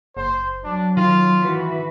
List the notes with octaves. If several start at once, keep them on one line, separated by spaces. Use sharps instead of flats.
F#1 C5
F#3 D4
D#3 F4
E3 F#4 B4